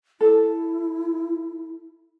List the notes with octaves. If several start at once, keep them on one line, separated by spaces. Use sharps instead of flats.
E4 A4